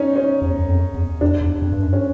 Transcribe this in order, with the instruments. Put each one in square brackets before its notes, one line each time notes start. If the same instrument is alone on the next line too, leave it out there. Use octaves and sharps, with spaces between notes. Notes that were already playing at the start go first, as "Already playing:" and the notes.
Already playing: [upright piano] C#4 D#4
C#4
[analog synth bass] E2
F#2
F2
E2
[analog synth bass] F2 [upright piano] D4
[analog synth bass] E2
F2
G2
F#2
[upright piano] C#4